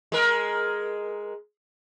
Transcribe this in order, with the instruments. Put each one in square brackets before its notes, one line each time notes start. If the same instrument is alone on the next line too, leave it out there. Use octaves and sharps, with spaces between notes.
[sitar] G#3 A#4